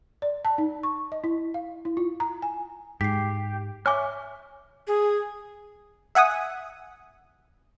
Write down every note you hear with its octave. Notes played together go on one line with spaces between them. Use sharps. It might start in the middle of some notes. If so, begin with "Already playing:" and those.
D5
A5
D#4
C#6
D#5
E4
F5
E4
F4
A#5
G#5
G#2 G4 B6 C7
C#5 E5 G#5 C#6 D6 F6
G#4
E5 F#5 G#5 D#6